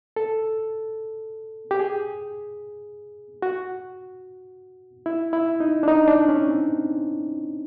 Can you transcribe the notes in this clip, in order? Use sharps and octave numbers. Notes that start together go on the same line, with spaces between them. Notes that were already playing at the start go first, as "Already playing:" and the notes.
A4
G4
G#4
F#4
E4
E4
D#4
D4
D#4
D4
C#4
C4